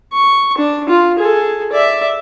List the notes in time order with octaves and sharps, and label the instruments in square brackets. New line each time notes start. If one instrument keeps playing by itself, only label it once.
[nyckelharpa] C#6
D4
F4
G#4 A4
D5 E5